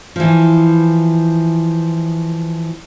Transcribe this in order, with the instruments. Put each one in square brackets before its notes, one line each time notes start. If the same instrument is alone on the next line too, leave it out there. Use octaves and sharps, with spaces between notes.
[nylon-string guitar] E3 F3